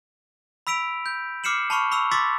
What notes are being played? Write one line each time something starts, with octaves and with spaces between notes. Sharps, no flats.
B5 E6 B6 D7 F7
G6
D6 F6 C7 C#7 E7 F#7
A5 B5 C#6 F6
B5 C#6 E6 F7
C6 D6 E6 A6 B6